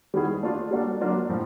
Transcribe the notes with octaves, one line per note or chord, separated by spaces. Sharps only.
D#3 G3 B3 E4 G#4
A3 D4 F4
G3 A#3 D4 F#4 A4
F#3 A#3 D4 F4
A2 F3